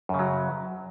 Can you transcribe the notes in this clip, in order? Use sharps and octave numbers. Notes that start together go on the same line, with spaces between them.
F#2 C#3 F#3